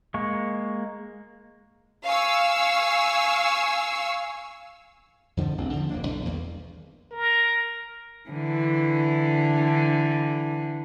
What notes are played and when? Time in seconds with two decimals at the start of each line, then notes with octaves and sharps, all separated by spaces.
0.14 G#3 A#3 C#6
2.05 F5 G#5 C#6 E6
5.37 F2 D3 E3 F3
5.58 A1 E2 C#3 C4
5.73 D3 F3
5.90 E1 F2 A#3 D4
6.07 B1 G3
6.25 E2 D#3 A#3
7.12 A#4
8.29 D3 E3